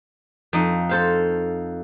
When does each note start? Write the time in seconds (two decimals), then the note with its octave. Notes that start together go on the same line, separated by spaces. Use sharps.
0.53 F2 D#4
0.89 A4 C5 F5